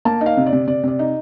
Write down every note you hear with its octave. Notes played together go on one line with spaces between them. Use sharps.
A#3 A5
D#4
F5
C3
D5
C3
C3 D5
C3 D5
D#4